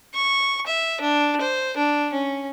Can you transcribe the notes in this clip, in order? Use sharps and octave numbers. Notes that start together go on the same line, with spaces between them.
C#6
E5
D4
C5
D4
C#4